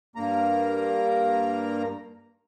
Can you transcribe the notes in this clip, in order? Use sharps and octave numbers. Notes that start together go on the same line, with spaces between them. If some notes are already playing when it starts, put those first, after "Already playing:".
G2 A#3 A#5